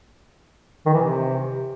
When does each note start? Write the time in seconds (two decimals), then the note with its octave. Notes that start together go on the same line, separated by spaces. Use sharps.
0.86 D#3
0.94 E3
1.01 C3